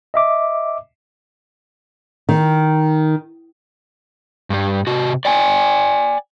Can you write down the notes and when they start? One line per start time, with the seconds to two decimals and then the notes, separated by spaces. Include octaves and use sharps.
0.14 D#5 E5 D6
2.29 D#3
4.50 G2 G3
4.87 C3 F#4
5.25 D5 G5 G#5